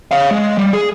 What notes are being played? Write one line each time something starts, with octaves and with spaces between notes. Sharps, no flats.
C#5 F5
G#3
G3
G#4